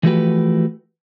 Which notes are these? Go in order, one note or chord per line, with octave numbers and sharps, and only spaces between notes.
E3 F3 A3 F#4 G4 B4